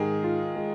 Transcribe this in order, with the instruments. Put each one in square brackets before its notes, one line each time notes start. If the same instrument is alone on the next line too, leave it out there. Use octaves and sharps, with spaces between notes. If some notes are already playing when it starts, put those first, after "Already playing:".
Already playing: [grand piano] G#2 G#4 [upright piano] D#3 G#3
[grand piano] F4
G#3